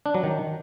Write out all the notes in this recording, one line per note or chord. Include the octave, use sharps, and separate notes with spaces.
D4
F#3
D#3